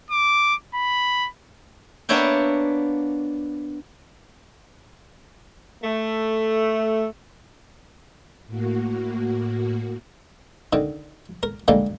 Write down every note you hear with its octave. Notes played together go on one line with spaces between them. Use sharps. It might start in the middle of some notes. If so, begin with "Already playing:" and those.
D6
B5
A#3 B3 D4 C#5 E5 G5
A3
A2 A#3 F#4
D3 D#3
A#4
D3 G3 G#3 A#3